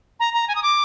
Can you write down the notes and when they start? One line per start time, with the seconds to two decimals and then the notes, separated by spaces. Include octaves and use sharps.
0.20 A#5
0.34 A#5
0.48 G#5
0.55 D#6
0.63 D6